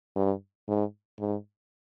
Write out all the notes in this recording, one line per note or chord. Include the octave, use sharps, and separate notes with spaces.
G2
G#2
G#2